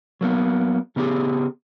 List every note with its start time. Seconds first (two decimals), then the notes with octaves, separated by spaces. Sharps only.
0.21 F#3 A#3 B3
0.96 C#3 B3 D#4 G4 G#4